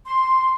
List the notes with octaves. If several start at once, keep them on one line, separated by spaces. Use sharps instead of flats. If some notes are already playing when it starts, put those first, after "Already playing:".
C6